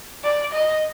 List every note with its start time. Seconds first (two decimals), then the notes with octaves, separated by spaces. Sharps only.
0.24 D5
0.52 D#5